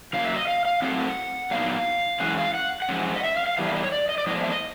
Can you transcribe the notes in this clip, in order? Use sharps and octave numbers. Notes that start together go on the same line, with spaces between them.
C#3 F#3 A#3 F5
E5
D#5
F5
F5
A2 F#3 A3 C4 F#5
A#2 F#3 B3 D#4 F5
E3 G#3 C#4 F#5
F5
F#5
F#5
F3 G#3 C#4
D#5
E5
F5
F5
E3 G3 B3 D4 F5
E5
D#5
C#5
D5
D#5
D5
A2 F3 G#3 B3 D4 D#5
E5
D#5